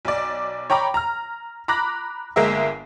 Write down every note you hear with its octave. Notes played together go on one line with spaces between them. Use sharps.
B1 D5
C#5 G5 A#5 B5 D6
A#5 F6
A#5 B5 D6 F#6 A#6
G1 G#3 A#3 A#4 E5